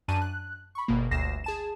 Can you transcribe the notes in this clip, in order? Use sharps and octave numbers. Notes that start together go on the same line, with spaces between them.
F#2 D4 A5 D#7
F#6
B5 C#6
G1 B2 A#3
G1 D2 A#6 C7 E7
G#4 A5 E7